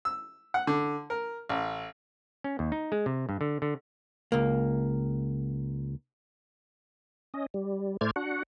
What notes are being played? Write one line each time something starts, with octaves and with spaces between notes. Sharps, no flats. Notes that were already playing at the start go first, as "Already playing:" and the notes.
E6
F#5
D3
A#4
A1
C#4
D#2
D#4
G#3
C3
G2
D3
D3
C#2 A#3
C#4 D#5
G3
A2 A3 C5 D5 F6 G#6
D4 F#4 F#5